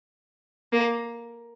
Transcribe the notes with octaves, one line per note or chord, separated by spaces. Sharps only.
A#3